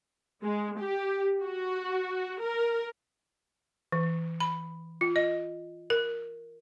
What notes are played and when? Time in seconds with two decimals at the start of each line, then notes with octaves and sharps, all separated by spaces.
0.44 G#3
0.78 G4
1.44 F#4
2.41 A#4
3.92 E3
4.40 B5
5.01 F4
5.16 D#5
5.90 A#4